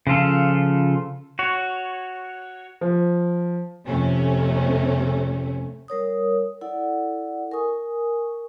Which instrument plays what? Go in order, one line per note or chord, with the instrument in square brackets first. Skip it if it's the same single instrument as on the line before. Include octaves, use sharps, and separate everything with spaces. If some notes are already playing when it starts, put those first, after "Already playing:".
[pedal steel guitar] C#3 F3 F4 A4
F#4 C#5
[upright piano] F3
[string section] F2 C3 A3 C#4
[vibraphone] G3 A#4 C#5 D#6
E4 A4 D5 F#5
A#4 G#5 C#6 D#6